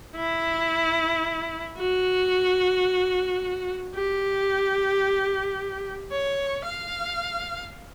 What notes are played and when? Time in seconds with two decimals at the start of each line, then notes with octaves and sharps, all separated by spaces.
0.16 E4
1.78 F#4
3.95 G4
6.11 C#5
6.65 F5